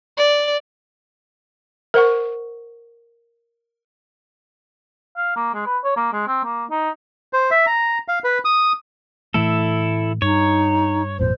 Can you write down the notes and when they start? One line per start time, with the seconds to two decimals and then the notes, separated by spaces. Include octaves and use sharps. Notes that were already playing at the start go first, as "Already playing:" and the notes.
0.17 D5
1.94 A#4 C5 F#5 C#6
5.17 F5
5.36 A#3
5.54 G#3
5.66 B4
5.84 C#5
5.96 A#3
6.13 G#3
6.27 C4
6.44 A#3
6.70 D#4
7.33 C5
7.51 E5
7.66 A#5
8.08 F5
8.24 B4
8.45 D#6
9.34 A2 E3 A3 E4 A4
10.22 G2 D#4 C#5
11.19 G#1 F2 A#2 C5